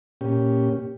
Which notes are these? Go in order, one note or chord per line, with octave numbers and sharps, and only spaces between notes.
A#2 C#4 G4